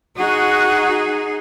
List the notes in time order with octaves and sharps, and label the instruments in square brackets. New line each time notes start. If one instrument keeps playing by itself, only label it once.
[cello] D#4 G#4 [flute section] F#4